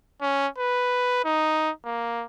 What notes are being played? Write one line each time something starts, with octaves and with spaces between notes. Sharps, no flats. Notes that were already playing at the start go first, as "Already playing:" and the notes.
C#4
B4
D#4
A#3